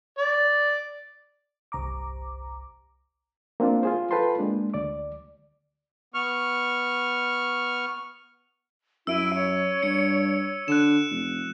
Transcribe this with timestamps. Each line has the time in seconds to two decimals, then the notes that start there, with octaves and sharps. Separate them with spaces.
0.18 D5
1.72 G1 C2 A#5 D6
3.60 A#3 C4 D4 F4
3.83 F4 G#4 C5
4.11 F4 A4 B4 G5 A5 C6
4.39 G#3 A#3 D4
4.74 D2 D5 D6
6.14 B3 C#6 F6
9.07 F#2 E4 E6 D7 D#7
9.34 C#5
9.83 G2 C#7
10.68 D3 F#6 E7
11.10 F1